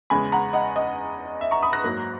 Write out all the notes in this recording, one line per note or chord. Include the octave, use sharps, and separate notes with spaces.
E2 C#3 G#3 G#5 B5
F#5 A#5
D#5 F#5
D#5
E5
A#5 C#6
B5 D#6
F#6 A#6
G#2 F#3 A#3